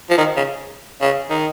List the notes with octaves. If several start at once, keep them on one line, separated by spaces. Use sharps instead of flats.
F3
D#3
C#3
C#3
D#3